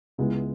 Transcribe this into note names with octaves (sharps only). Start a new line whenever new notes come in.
C#2 C#3 G#3 B3 E4